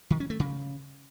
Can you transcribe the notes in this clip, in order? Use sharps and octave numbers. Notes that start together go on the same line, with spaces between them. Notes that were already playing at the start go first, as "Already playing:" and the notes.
D#3
C#4
A3
C#3